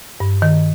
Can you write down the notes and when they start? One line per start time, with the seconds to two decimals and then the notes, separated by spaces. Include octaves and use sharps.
0.20 G2
0.42 D#3